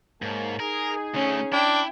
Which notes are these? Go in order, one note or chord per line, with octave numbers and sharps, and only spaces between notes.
G#2 A#3 C#5 A5
D#4 G#4 A#4
D2 A3 C#4
D4 E4 G5